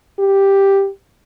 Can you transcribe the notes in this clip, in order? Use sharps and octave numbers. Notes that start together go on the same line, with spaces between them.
G4